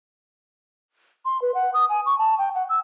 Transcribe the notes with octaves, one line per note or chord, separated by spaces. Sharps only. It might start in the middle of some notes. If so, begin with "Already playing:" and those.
C6
B4
F#5
D#6
G#5
C#6
A5
G5
F#5
E6